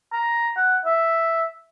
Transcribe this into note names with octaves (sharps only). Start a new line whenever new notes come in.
A#5
F#5
E5